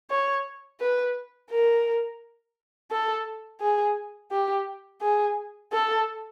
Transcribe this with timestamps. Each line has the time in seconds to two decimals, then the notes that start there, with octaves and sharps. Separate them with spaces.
0.10 C#5
0.80 B4
1.50 A#4
2.91 A4
3.61 G#4
4.31 G4
5.01 G#4
5.73 A4